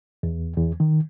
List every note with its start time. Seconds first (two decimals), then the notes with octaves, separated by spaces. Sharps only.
0.23 E2
0.57 E2
0.80 D#3